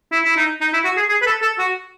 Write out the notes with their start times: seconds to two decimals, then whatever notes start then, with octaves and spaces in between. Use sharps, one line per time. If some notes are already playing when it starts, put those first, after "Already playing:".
0.12 E4
0.25 E4
0.36 D#4
0.61 D#4
0.73 E4
0.85 F#4
0.97 G#4
1.09 G#4
1.22 B4
1.27 A4
1.42 A4
1.59 F#4